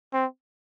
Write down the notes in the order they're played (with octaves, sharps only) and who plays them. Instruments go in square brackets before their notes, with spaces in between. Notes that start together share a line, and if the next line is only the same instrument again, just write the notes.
[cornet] C4